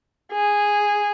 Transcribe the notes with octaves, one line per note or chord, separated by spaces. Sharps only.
G#4